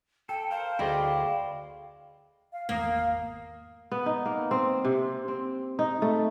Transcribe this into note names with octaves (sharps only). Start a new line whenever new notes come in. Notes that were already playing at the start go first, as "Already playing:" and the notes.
A4 G5
A#4 C5 F5
D2 E4 G#4 D5 D#5 G5 C6
F5
G#1 E2 A#3 F5 D#6
B3
D#4
A#3
C4
C3
C4
D#4
A3